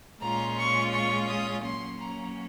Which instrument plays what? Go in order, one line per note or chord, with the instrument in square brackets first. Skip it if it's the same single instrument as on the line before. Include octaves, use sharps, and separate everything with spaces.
[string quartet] A#2 G#3 C#4 F4 A#5
C#6
C#6
D#6
F#3 A#3 C#4 C6
A#5